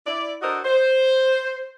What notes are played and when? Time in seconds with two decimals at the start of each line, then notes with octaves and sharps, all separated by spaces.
0.06 E4 D5
0.42 D4 F#4 A4 A#4 C5 D#5
0.65 C5